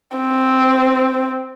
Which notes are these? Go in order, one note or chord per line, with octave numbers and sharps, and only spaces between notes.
C4